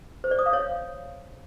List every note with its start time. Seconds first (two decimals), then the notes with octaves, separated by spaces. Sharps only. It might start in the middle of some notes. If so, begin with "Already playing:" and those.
0.24 C5
0.31 D5
0.39 D#6
0.46 F5
0.53 C#5